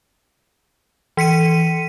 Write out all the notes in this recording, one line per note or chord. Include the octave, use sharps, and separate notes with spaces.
E3 B6 C#7 D#7